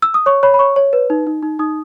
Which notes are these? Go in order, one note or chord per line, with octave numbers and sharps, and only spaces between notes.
E6
D#6
C#5 C#6
C#5 B5
B5
C#5 C#6
C#5
B4
D#4
D#4
D#4
D#4 D#6